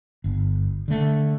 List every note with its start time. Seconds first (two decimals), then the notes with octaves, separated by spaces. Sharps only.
0.24 G1
0.88 D3 A3